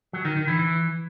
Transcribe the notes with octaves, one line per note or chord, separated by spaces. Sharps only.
F#3
D#3
D#3
E3
E3